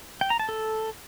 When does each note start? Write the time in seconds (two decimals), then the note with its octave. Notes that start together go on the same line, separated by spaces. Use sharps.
0.21 G5
0.30 A#5
0.39 A5
0.49 A4